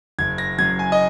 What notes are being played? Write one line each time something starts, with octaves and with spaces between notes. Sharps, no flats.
F#1 G#6
A#6
F#2 G#6
G#5
D#5